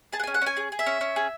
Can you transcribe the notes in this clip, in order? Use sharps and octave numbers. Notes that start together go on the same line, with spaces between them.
G#4 A5
F#5
C#4 G#5
F#5
C#4 G#5
G#4
G#4
E5
C#4
C#4
G#4